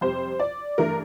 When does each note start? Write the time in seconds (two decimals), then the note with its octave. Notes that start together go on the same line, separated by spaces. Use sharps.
0.01 F2 C3 G3 C5
0.40 D5
0.78 G2 E3 A3 D4 A#4